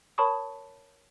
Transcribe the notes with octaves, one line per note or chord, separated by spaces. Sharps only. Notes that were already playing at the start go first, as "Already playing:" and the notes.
A#4 C#5 A5 B5 C#6 D#6